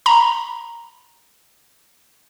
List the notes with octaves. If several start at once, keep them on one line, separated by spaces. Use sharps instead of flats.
A#5 B5